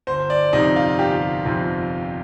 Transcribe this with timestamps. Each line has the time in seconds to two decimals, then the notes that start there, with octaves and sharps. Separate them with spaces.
0.07 G1 C5
0.30 D5
0.53 F2 C3 F3 D#4
0.76 F4
0.99 G1 G4
1.45 F2 C3 F3